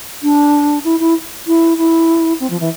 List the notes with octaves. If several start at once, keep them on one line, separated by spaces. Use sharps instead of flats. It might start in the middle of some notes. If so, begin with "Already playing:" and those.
D4
E4
E4
E4
E4
C4
F3
E3